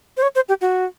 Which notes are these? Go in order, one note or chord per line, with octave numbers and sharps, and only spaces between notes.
C5
C#5
C5
G4
F#4